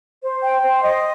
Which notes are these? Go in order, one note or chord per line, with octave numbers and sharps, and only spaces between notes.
C5
G5
C5
D#5